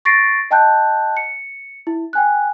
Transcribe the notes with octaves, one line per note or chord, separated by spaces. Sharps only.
C#6 A6 A#6 C7 D7
D#5 G5 A5 F#6 G6
C#7
E4
G5 G#5 F#6